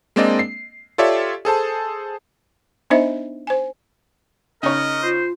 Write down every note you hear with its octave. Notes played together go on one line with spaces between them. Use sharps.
G#3 A#3 C4 D4 D5 D#5
C7
F4 G4 A4 C#5 D5 E5
G#4 A4 C5 A5
B3 D4 D#4 C5 D#5 E5
C5 G#5
C#3 D#4 A#4 C#5 D#5
F4 C5